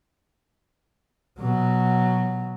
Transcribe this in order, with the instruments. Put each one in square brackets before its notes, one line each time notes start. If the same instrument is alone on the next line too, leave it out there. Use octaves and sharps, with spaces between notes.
[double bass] B2 F#3